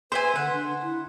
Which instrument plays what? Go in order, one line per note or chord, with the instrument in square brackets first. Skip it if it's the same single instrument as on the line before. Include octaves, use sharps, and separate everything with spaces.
[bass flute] B4 [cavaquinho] C5 E5 G#5 [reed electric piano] C6
[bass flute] D3 [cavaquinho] F#5
[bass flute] D4
E4